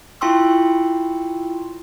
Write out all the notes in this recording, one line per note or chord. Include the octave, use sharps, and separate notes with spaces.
E4 F4 G5 C6 C#6 E6